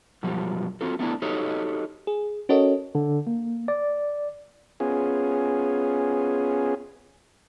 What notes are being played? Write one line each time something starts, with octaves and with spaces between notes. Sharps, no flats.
F#2 B2 F3 G3
C4 F4 F#4 A4
A3 B3 D4 E4
D#4 F#4 G4 A4 C#5 D#5
G#4
C#4 F#4 A4 A#4 C#5 D#5
D3
A#3
D5
B3 C#4 F4 G#4